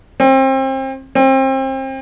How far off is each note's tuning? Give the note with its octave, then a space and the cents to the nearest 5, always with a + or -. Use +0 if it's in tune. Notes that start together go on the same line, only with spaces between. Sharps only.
C4 +30
C4 +30